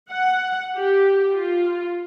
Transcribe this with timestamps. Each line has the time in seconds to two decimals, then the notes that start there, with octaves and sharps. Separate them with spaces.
0.10 F#5
0.77 G4
1.32 F4